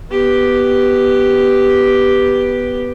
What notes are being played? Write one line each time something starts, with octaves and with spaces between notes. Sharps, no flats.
B3 G4